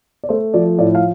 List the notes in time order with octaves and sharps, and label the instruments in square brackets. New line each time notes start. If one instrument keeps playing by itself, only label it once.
[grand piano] D5
A3 C5
F3 D5
A2 D5
F5